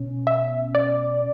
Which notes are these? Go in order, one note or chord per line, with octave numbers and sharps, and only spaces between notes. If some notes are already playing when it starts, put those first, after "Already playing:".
Already playing: B2 C#4
E5
D5